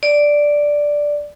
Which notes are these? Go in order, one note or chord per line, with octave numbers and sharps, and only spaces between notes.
D5